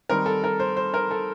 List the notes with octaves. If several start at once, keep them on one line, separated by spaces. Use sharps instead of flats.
D#3 G3 C4 D#4 A#4
A4
A#4
C5
C5
A#4
A4